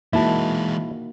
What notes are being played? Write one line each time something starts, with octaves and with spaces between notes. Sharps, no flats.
E3 G#3 A#3 D#4 E4 F#4 A5